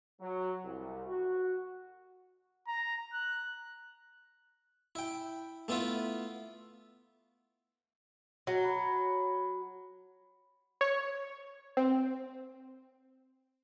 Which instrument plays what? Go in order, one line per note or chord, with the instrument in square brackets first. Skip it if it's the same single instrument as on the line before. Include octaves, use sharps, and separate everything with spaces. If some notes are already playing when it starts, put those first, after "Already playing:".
[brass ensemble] F#3
C2
F#4
[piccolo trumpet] A#5
F#6
[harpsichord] E4 G5
A3 B3 E4 F4 B4
[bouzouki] F#3 [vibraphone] F#4
[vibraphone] B5
[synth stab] C#5
C4